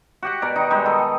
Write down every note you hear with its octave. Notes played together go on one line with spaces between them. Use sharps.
F#4 G4 F#5
B2 A#4 D5
D#3 D#4
G3 G#3 D#4 G#4
D#3 A4
G5